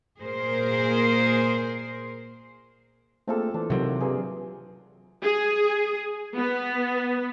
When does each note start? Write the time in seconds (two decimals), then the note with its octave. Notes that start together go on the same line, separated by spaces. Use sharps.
0.19 A#2 G#4 A#4 C5
3.28 A3 A#3 C4 D4 F4 G#4 A4
3.54 E3 D4
3.70 D#2 C3 F#3 C4
4.00 G2 A#3 G#4
5.22 G#4
6.36 B3